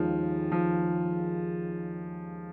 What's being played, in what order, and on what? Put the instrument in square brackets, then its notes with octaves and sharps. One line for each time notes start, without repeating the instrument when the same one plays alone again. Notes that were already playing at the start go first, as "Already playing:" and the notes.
Already playing: [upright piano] D#2 D#3 G#3 C#4 [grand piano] F3
[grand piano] F3